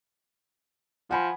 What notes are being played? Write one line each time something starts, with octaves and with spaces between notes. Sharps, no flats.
F3 F#5 G#5 B5